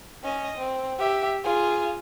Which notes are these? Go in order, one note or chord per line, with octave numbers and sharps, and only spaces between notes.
C#4 D#5
C4
G4 E5
F4 G#4